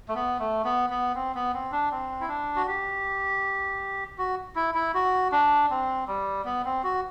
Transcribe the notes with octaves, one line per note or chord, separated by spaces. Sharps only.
A3
B3
A3
B3
B3
C4
B3
C4
D4
C4
E4
D4
F#4
G4
F#4
E4
E4
F#4
D4
C4
G3
B3
C4
F#4